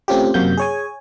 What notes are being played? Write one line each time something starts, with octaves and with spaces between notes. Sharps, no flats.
A3 C4 C#4 F4 G4
F#2 C3 A#3 F#4 G6
G#4 C#5 G#5